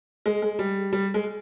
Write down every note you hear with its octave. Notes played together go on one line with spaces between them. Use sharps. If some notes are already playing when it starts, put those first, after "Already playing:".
G#3
G#3
G3
G3
G#3